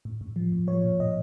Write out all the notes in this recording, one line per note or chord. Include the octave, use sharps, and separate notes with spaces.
A2
A2
F3
A2
F3 C#5
A#2
A#2 D#5